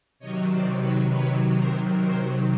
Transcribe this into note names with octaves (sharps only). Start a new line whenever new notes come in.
C3 D#3 F#3 C#5 D#5
C5 D5
B4 C#5
B4 C#5
A#4 C5
A#4 C5